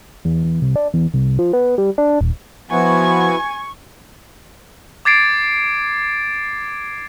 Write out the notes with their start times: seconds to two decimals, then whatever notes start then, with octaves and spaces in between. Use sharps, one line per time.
0.25 E2
0.44 E2
0.62 C2
0.76 D4
0.94 E2
1.14 C2
1.39 F3
1.53 B3
1.78 G3
1.98 D4
2.21 D#1
2.71 F3 B3 E4 F#4 G#5 C#6
5.05 D6 G#6 A6 C7 D7